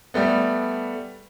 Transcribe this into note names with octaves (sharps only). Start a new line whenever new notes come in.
G3 A3 B3